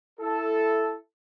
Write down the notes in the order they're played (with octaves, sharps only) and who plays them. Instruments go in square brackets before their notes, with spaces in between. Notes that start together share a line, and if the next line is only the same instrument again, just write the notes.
[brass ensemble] E4 A4